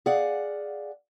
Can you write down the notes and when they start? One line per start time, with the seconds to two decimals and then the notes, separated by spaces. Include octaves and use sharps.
0.06 G#4 D5 F5 F#5